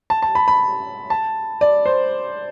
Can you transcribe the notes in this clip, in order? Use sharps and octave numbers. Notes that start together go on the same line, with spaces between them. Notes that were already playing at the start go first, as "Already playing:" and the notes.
A5
A5
B5
B5
A5
D5
C5